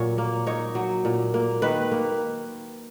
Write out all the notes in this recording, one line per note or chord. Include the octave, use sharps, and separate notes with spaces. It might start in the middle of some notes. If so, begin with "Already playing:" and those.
Already playing: A#2 F#3 C#5
A#3
D#4 C#5
F#3
A#2
A#3
D#3 B4
A#3